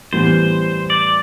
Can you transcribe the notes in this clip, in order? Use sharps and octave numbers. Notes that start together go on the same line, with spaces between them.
A2 E3 G3 B3 C5
D5